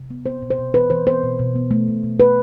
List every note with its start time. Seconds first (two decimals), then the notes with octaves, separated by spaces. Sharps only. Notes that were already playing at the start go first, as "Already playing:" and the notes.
Already playing: C3
0.10 B3
0.26 B3 C5
0.42 B2
0.50 C5
0.59 B2
0.74 E3 B4
0.90 E3 C5
1.07 B3 C5
1.24 B2
1.39 B2
1.56 B3
1.71 A3
1.88 B2
2.04 B2
2.20 B3 B4